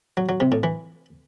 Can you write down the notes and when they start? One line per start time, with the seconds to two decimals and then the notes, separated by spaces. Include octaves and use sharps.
0.17 F#3
0.29 F#3
0.40 C3
0.52 A2
0.63 E3